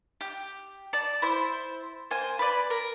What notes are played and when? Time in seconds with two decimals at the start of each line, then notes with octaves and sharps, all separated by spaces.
0.21 G4
0.93 D5 A5
1.22 E4 C5
2.11 A#3 C5 G#5
2.39 B4 D5
2.70 A#4